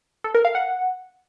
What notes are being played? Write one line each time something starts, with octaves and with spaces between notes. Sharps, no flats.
A4
A#4
F5
F#5